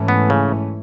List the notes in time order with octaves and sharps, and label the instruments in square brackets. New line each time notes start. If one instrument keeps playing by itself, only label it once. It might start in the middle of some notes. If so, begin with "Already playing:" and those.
Already playing: [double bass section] G#2 E3 A3 C#4
[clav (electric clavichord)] B3
C#3